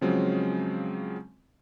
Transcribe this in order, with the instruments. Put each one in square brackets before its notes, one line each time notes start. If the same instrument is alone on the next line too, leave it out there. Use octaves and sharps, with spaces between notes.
[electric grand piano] C#3 F3 F#3 G#3 C4 C#4